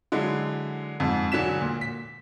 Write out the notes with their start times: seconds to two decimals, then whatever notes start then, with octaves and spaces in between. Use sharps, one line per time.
0.12 D3 F#3 G#3 E4
1.00 F2 G#2
1.32 E1 D3 F#3 B6 E7
1.61 A#2
1.81 B6